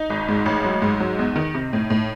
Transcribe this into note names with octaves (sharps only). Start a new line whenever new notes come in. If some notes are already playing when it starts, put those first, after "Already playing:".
Already playing: D#4
G#1
G#2
A1
F#3
G#2
F#3
E2
D#3
C3
A2
A2